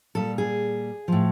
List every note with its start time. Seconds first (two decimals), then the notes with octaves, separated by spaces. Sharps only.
0.15 A#2 G3 A4
0.38 G#4
1.08 A2 F3